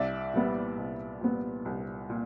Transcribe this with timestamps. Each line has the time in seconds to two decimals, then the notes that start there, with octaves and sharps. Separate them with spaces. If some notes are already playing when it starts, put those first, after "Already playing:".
Already playing: C2 D5 E5
0.34 A#2 G3 B3
0.77 C2
1.21 A#2 G3 B3
1.65 C2
2.10 A#2